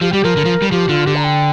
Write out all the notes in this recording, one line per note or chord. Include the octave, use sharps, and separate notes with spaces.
F3 G4
G3 G4
F3 A#4
D3
F3
G3
F3 G4
D3 F4
D3 G4
A#5
G5